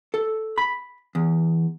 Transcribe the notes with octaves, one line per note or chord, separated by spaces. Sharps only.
A4
B5
E2